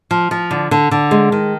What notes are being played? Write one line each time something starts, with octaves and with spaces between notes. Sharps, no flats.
F3
F3
D3
D3
D3
G#3
D#3